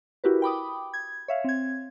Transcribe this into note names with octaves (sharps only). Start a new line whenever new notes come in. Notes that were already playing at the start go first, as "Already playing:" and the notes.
E4 F#4 G4 A#4 B4
G5 B5 D6 D#6
G#6
C#5 E5 F5
C4 G#6